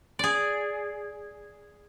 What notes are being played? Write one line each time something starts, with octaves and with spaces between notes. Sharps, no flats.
G#4 D5